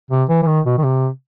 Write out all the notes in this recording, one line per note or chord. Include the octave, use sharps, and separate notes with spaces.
C3
E3
E3
D#3
B2
D#3
C3